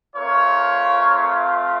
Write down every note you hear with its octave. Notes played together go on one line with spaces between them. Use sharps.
A3 C4 F4 A#4 C#5